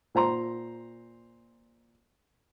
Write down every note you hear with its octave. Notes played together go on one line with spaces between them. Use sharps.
A#2 C5 A#5 C6